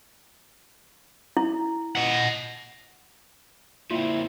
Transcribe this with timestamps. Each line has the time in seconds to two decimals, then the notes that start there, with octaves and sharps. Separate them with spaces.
1.37 E4
1.95 D#5 F#5
3.91 A#2 C4 E4 F4